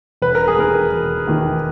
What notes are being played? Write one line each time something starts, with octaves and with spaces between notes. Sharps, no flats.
E1 B4
A#4
G#4
D#2 D#3 A#4
E1
D#2 D#3